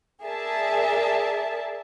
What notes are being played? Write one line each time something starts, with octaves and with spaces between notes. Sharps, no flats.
G#4 A#4 D5 E5 A5